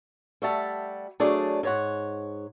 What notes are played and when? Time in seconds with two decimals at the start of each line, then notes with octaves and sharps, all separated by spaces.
0.42 G3 A3 G4 E5 F#5 A5
1.20 F#3 A3 D4 G#4 C#5 D5
1.63 G#2 C#5 F#5